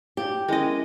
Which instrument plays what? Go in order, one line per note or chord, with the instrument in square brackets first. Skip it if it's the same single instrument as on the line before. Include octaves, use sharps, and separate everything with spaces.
[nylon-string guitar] G4
[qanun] G#3 D#5 [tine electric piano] C#4 E4 A#4